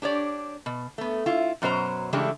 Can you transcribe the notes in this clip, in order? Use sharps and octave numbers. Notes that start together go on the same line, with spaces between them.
D4 G4 C#5 D5
B2
A3 B3
E4 F4
F#2 B2 F#3 C5 A#5
C#3 E3 G#3 A3 D4 G4